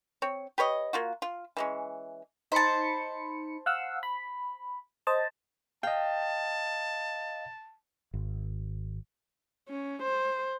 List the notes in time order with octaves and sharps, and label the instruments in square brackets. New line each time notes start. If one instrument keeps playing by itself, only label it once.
[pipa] C4 C#5
G4 B4 C#5 D#5
A#3 F4 F#4
F4
E3 G#3 C#4
[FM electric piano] D#4 B5 C#7 [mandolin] C5 A5
[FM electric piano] F5 F#5 E6
B5
C5 D#5 A5
[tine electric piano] D#5 F5 [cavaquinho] G5 [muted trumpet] A5
[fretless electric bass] G#1
[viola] C#4
C5